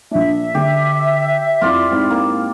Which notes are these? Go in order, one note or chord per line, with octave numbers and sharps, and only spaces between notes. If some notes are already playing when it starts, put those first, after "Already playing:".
A#1 D4 E5
D3 G4
F2 E4 F4 D5 C6
G#2 C4 E4
A#3